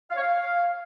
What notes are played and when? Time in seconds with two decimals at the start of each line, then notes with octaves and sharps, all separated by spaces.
0.11 F5
0.16 C#5
0.21 F5